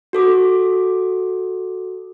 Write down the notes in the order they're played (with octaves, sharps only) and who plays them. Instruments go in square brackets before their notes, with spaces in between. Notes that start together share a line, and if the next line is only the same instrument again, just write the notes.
[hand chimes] F#4 A4 D6